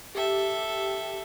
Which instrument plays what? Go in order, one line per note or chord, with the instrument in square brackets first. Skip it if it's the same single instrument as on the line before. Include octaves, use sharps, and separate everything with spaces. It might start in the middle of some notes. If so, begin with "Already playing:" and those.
[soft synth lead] G4 [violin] A4 E5